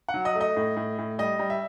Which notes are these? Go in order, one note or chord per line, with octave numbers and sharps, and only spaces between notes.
F#5
F#3
D#5
A3
D#5
A2
A2
A2
G3 D#5
G3
E5